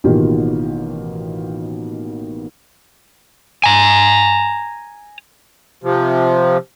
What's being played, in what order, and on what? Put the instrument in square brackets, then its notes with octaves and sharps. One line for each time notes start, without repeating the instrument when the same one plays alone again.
[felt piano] A1 B2 D#3 A#3 F4 G4
[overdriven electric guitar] G#5 A#5
[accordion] C3 F3